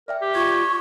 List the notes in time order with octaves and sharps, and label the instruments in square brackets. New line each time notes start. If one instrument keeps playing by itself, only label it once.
[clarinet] A#4 [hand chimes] D5 E5 G5
[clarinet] G4
[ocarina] F4 [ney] C#6 [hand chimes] G#6